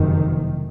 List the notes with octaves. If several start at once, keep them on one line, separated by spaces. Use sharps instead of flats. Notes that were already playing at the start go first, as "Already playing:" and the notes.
Already playing: F#1 F2 C3 D#3